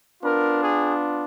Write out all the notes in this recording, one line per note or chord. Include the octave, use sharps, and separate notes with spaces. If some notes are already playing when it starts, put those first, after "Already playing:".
B3 D4 F4 A#4
G#4